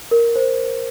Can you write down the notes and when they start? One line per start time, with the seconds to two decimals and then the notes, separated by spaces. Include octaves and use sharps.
0.11 A#4
0.36 C5